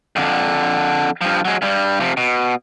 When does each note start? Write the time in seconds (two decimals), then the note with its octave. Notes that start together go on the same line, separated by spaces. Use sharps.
0.16 F2 D3
1.21 G2 F3
1.45 F#3 G#3
1.62 G2 G3
2.00 C3 F3
2.17 B2